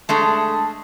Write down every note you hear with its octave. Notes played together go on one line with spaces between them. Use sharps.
G#3 A3 D4 A5